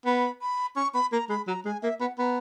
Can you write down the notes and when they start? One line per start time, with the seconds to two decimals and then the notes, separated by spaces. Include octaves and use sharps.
0.06 B3 B5
0.42 B5
0.76 C#4 C#6
0.94 B3 B5
1.12 A#3 A#5
1.30 G#3 B5
1.47 F#3 A#5
1.65 G#3 G#5
1.82 A#3 E5
2.00 B3 F#5
2.18 B3 A#5 B5